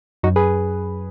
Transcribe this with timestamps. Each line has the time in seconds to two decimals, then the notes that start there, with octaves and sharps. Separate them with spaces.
0.23 F#2 D#4 F#4
0.36 G#4 B4